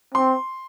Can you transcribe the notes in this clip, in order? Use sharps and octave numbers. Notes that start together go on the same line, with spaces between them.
C4 C6